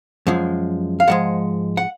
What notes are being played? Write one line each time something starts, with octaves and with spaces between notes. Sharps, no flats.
F#2 F3 G#3
F5
G#2 F3 G#3 F#5
F#5